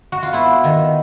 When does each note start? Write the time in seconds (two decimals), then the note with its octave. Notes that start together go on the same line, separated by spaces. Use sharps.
0.12 F#4
0.23 F4
0.33 B3 E4
0.64 D#3